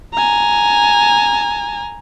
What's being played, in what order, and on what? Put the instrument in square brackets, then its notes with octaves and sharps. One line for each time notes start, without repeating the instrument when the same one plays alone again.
[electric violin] G#5 A#5